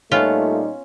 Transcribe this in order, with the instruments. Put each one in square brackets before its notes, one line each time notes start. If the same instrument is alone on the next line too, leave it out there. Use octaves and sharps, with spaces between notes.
[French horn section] A#2 G3 D#4 [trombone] A3 [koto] B3 F4 [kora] C#4